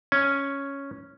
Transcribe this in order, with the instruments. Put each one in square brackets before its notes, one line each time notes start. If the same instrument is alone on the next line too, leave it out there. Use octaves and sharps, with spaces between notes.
[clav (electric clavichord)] C#4